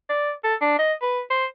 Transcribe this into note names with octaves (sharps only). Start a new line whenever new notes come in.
D5
A4
D4
D#5
B4
C5